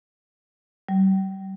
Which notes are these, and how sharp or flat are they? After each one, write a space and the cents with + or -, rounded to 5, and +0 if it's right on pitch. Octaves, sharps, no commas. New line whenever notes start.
G3 -35